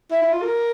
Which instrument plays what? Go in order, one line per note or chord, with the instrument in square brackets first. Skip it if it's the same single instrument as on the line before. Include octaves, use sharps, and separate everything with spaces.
[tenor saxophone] E4
E4
F4
A#4